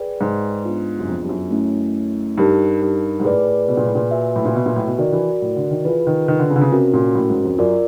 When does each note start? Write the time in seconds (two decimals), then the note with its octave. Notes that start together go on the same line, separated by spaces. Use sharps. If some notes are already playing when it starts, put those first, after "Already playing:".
Already playing: G#4 B4 D5 G5
0.21 G#2
0.64 B3 D4 F4 G#4
0.99 F#2
1.08 F2
1.23 G2
1.29 F#2
1.51 A3 C#4 E4
2.38 G2 D#4 G4 A#4
2.81 G2
3.20 G#2
3.24 A2 G#4 B4 D5
3.68 B2
3.77 A#2
3.86 A2
3.95 A#2
4.11 F#4 B4 E5 G#5
4.36 A2
4.45 A#2
4.55 B2
4.66 A#2
4.76 A2
4.87 B2
4.98 D#3 F#4 A#4 D5
5.12 E3
5.42 A2
5.56 D3
5.71 D#3
5.85 E3 F4 G#4 B4
6.07 D#3
6.28 D#3
6.39 D3
6.50 C#3
6.56 D3
6.61 C#3
6.72 C3 C#4 F#4 A#4
6.94 A#2
7.15 A2
7.30 G#2
7.44 F2
7.58 F#2 F4 A#4 D5